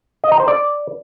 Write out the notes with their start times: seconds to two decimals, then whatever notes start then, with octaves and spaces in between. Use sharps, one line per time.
0.24 D#5
0.32 A#5
0.40 C5
0.48 D5